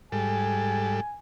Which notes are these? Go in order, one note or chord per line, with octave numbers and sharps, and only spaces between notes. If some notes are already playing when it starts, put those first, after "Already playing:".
G#2 G3 A4 G#5